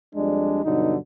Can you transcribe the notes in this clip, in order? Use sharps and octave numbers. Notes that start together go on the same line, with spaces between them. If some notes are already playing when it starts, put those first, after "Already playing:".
F2 G3 G#3 D4
G2 B2 D3 F#3 D#4